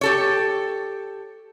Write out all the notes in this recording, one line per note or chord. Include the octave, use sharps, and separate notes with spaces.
G4 A4 C#5